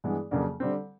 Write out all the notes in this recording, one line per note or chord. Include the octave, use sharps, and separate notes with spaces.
G2 E3 G#3 B3
F2 C#3 F#3 A#3 D4
D3 G3 C4